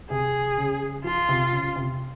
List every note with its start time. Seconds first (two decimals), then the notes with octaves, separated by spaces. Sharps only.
0.10 C3 G#4
0.57 C#3
1.04 F3 F4
1.29 C3
1.52 C#3
1.76 C3